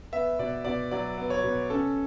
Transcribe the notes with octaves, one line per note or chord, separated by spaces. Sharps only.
B3 E5
B2 D5
B2 D5
F#3 D5
B3
C#5
B2
C#4 A4